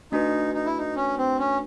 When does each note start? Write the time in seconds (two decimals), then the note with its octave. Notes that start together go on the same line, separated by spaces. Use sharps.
0.12 A3 D4 D#4 F#4 B4
0.54 D#4
0.66 E4
0.78 D#4
0.96 C#4
1.18 C4
1.39 C#4